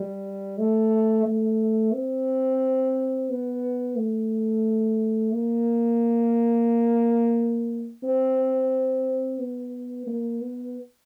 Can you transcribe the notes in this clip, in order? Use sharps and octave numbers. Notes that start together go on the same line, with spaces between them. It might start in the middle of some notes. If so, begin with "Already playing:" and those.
Already playing: G3
A3
A3
C4
B3
A3
A#3
C4
B3
A#3
B3